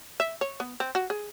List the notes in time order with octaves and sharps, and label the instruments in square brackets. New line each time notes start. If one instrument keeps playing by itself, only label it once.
[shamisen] E5
C#5
B3
C4
F#4
G#4